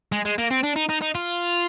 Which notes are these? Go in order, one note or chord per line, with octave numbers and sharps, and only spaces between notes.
G#3
G#3
A#3
C4
D4
D#4
D#4
D#4
F4